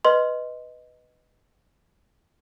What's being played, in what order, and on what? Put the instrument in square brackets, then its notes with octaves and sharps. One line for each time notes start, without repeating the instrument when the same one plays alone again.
[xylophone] B4 D#5 C6